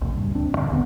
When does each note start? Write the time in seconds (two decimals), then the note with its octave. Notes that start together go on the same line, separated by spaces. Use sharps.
0.01 A#1 D#2 A2 C3
0.12 D2 G2 A#2
0.35 D2 C4 D4
0.57 A2 D3
0.70 A1 E2 D3 B3